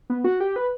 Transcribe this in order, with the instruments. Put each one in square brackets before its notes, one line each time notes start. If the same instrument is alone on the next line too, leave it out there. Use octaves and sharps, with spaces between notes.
[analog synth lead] B3
F#4
G4
B4